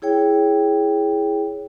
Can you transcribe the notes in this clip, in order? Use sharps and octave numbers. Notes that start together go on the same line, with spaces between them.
E4 G#4 C#5 G5